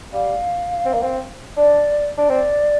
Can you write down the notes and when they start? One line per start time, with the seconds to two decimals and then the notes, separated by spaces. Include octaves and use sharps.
0.13 G3 F5
0.85 C4
0.94 A#3
1.03 C4
1.57 D4 D5
2.18 D4
2.28 C4 D5